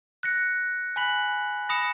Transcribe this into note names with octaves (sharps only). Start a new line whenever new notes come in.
F#6 A#6 C#7
G#5 B5 F#6 B6 F#7
B5 D#6 A#6 C#7 E7